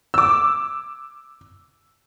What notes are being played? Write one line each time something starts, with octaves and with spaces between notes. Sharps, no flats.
D6 E6